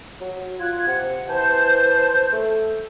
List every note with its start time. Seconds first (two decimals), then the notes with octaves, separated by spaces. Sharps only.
0.21 F#3
0.59 F4 F#6 G#6
0.87 C3 F#5
1.29 E3 C5 A5 G6
2.33 A3